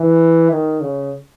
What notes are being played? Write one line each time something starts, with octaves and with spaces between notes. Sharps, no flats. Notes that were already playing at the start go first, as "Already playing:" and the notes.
Already playing: E3
D#3
C#3